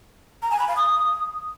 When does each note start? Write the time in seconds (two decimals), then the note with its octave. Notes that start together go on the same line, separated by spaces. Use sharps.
0.42 A#5
0.51 G#5
0.59 B5
0.68 F5
0.76 D#6